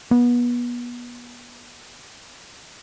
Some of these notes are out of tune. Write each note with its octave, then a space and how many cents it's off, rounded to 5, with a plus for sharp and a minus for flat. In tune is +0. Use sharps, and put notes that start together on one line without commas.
B3 -30